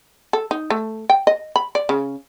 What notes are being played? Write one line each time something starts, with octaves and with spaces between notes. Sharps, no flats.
A4
D#4
A3
G5
D#5
B5
D5
C#3